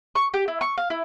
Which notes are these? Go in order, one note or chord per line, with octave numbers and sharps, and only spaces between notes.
C#6
G4
E4
C#6
F5
E4